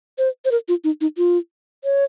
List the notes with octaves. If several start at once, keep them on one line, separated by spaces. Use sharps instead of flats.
C5
C5
A#4
F4
D#4
D#4
F4
C#5